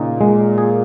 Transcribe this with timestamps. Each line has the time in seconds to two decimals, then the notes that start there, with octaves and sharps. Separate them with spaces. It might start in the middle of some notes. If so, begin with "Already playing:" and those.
Already playing: A#2 C#3 D#4
0.21 G#3
0.58 G#4